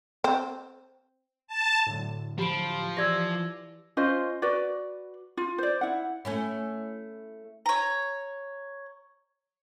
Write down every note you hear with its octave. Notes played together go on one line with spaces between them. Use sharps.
C4
A5
A2 D3 F#3
F3 G4 B5 D7
E3 G4 D5 D6 E6 G#6 A#6
C#4 F4 C5 D#5
F#4 B4 D5
F4
C5 D5
E4 F#5
A3 C#4 E4
C#5 A#5